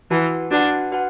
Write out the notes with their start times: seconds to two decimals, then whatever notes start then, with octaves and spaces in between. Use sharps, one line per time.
0.11 E3 F#4 B4 F#5 A5
0.51 D4 F#4 B4 F#5 A5
0.92 F#4 B4 F#5 A5